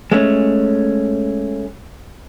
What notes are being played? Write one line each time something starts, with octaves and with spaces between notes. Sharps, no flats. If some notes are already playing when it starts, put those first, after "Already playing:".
G#3 A3 C#4